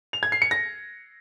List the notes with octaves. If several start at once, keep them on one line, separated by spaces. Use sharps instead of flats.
F7
G#6
C7
C#7
A#6